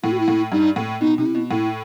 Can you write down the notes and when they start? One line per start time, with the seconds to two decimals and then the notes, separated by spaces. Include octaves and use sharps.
0.03 A2 E4
0.12 F#4
0.20 E4
0.28 A2
0.52 G2 D#4
0.76 A2
1.01 B2 D#4
1.18 C3 D#4
1.26 E4
1.35 B2
1.51 A2 E4